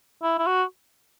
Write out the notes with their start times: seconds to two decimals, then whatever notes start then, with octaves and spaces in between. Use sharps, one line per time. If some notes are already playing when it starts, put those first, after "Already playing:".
0.23 E4
0.38 E4
0.46 F#4